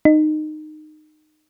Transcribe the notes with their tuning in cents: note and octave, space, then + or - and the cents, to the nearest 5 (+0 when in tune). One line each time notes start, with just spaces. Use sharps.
D#4 -20